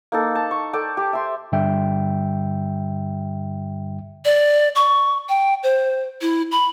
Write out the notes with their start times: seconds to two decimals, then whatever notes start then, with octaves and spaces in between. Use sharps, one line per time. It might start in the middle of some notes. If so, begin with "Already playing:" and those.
0.12 A#3 D#4 A4
0.35 A5
0.51 C#6
0.73 A4 D5 G5 A5
0.97 G4
1.13 E5 C6
1.52 G2 D3 G3 E5 G5
4.25 D5
4.75 C#6
5.29 G5
5.63 C5
6.21 E4
6.51 B5